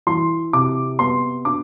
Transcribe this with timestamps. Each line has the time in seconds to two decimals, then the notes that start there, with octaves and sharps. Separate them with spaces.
0.07 E3 C6
0.53 C3 D6
0.99 B3 C6
1.45 D4 D6